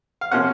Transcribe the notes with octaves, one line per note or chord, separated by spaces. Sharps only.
F5
C3 F3 A#3 C#4 F#5